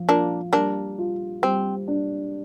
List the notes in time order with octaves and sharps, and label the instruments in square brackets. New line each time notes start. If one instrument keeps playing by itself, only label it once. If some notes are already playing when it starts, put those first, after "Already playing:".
Already playing: [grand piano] F3
[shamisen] A#3 D4 [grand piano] F4
[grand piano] G3 [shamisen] A#3 D4
[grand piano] F4
[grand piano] G3 [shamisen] C4
[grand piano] D4